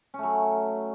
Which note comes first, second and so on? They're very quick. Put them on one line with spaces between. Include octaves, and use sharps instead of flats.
C#4 A3 F#3